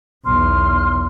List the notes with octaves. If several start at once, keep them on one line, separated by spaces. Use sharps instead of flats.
B1 E2 C6 F6